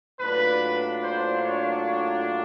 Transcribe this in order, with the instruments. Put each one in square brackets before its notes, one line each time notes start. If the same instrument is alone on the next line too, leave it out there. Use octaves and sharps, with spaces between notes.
[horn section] A2 F#3 A#3 D4 F4 [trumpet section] B4
[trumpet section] C5
C#5
C#5